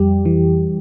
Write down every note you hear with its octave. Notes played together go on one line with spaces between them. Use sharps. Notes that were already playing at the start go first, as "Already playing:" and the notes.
Already playing: F2 G3 G4
E3